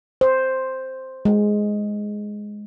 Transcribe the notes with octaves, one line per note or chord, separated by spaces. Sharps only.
C5
G#3